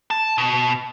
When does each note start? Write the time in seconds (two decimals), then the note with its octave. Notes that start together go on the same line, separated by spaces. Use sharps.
0.11 A5
0.38 B2